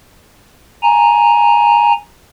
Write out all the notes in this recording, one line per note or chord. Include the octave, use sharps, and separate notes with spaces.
G#5 A#5